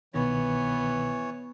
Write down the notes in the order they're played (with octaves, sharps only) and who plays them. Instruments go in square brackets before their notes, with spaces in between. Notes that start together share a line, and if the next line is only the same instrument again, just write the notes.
[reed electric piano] C2 B2 D#3 [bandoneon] E3 C#5 [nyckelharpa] B3